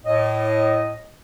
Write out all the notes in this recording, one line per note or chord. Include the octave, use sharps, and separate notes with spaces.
A2 D#5